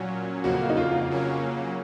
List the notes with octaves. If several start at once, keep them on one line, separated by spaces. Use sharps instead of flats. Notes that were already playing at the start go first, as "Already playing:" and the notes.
Already playing: A#2 F#3 C#4 F#4
F2 C#3 F3 A#3 F#4
D#4
F4
C#3 F#3 A#3 C#4